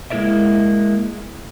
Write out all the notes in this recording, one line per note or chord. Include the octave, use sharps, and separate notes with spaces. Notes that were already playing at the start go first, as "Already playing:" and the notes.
G#3 A#3 E4 A#4 D5 E5